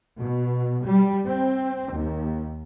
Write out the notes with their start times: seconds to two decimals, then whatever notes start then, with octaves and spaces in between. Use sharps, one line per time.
0.19 B2
0.84 G3
1.26 C4
1.95 D#2